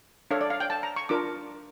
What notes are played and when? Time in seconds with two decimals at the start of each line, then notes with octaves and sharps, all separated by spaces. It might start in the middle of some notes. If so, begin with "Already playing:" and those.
0.31 D4 A4 C#5 F5
0.41 D5
0.50 F5
0.60 G5
0.70 A5
0.83 A#5
0.96 C#6
1.09 D4 F4 A#4 D6